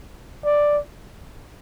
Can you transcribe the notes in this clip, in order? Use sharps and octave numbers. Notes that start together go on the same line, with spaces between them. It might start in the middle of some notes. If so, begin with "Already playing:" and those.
D5